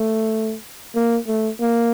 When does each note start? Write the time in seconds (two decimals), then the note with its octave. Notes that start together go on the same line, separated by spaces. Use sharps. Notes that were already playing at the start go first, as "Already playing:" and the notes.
Already playing: A3
0.95 A#3
1.27 A3
1.60 A#3